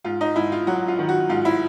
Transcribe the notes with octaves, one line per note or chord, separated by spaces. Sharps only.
G#2 F4
D#4
G#2 E4
F4
F#3 F#4
F4
D#3
F#4
G#2 F4
E4